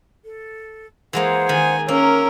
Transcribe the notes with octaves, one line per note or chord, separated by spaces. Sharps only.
A4
E3 G#3 A#3 G#4 C5 F#5
D#3 G#5
A#3 C#4 A#4 E6